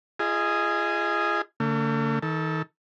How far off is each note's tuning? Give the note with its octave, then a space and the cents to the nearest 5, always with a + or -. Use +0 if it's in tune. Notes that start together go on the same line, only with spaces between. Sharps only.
F4 -40 G#4 +0 D#5 +0
D3 -35 A3 +45
D#3 +35 A4 +0